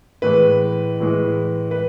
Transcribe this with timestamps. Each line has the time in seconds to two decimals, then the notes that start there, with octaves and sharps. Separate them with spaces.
0.22 A2 E3 G#3 B4
1.00 A2 E3 G#3
1.71 B4